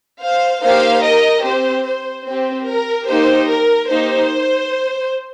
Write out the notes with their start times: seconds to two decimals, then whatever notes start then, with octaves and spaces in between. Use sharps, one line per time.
0.21 C5 F5
0.62 A#3 D#4 G4 C5 F5
1.02 A#4 D#5
1.44 C4 G4 C5
1.85 C5
2.26 C4 G4 C5
2.66 A#4
3.07 A#3 D#4 G4 C5
3.48 A#4
3.89 A#3 D#4 G4 C5